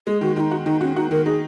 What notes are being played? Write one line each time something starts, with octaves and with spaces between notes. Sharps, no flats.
G#3 G#4
D#3 F#4
D#3 D#4 F#4
F#4
D#3 D#4
C#4 F#4
D#4 F#4
D#3 A#4
D#4 G#4